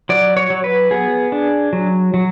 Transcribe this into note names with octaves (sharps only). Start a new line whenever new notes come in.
F#3 D5
C#5
F#3
B4
B3 G#4
D4
F#3
F#3